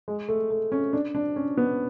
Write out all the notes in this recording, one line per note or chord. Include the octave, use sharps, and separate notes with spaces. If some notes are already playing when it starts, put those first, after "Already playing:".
G#3
A3
A3
C#4
D4
D4
C#4
B3